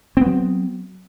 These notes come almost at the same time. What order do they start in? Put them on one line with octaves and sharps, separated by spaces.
C4 B3 F#3